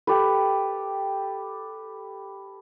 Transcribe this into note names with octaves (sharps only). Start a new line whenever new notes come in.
G4 A4 B4